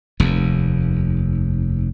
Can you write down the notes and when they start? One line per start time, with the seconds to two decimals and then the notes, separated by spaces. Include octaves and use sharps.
0.20 F1 D#2